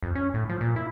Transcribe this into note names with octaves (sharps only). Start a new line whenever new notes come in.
F2
C#4
A2
F3
A#2
E4